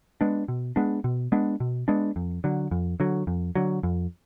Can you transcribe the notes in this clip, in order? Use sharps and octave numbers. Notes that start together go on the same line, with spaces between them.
G#3 B3 D4
B2
G#3 B3 D4
B2
G#3 B3 D4
B2
G#3 B3 D4
F2
D3 F#3
F2
D3 F#3
F2
D3 F#3
F2